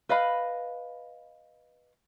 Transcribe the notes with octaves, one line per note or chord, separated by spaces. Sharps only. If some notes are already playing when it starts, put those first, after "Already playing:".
B4 D#5 F5 B5